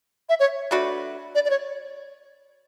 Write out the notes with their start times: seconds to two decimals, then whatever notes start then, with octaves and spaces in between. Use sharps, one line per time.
0.29 E5
0.40 C#5
0.71 A3 D4 F#4 B4
1.35 D5
1.45 D5
1.50 C#5